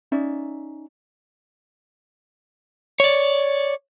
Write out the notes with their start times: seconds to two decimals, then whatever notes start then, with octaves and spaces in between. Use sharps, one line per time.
0.12 C#4 D#4 D5 E5
3.00 C#5 D5